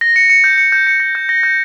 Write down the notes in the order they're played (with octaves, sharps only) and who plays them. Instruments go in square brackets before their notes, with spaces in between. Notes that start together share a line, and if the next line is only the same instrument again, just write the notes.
[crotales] A#6
C#7
C#7
G6
C#7
G6
C#7
A#6
G6
A#6
G6